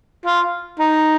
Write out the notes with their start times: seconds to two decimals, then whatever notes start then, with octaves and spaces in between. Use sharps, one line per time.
0.26 F4
0.79 D#4